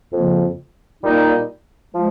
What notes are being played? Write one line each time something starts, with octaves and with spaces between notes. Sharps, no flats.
F2 C#3 F3 A#3
A#2 G3 A#3 D#4
F3 G#3